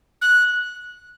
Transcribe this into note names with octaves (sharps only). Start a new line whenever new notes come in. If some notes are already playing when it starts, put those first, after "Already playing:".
F#6